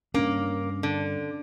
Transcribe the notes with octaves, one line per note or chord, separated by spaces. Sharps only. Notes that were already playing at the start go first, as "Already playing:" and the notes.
G2 A#3 C#4 D4
D3